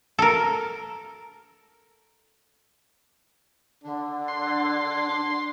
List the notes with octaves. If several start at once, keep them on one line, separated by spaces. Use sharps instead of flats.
A4 A#4
D3 D4
C6
D4